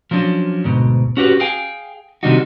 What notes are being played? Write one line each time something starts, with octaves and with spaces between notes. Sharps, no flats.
F3 F#3 C#4 D4
D2 G#2 B2
C#4 F#4 G4 B4
G#4 F5 G5 G#5
C3 D#3 G3 D4 D#4 F#4